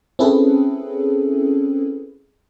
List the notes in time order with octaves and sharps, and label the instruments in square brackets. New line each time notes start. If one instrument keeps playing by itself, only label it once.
[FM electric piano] C4 C#4 E4 G#4 A4 B4